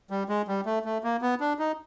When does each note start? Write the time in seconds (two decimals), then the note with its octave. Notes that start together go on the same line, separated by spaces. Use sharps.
0.10 G3
0.29 G#3
0.48 G3
0.66 A3
0.85 A3
1.04 A#3
1.22 B3
1.40 D4
1.59 D#4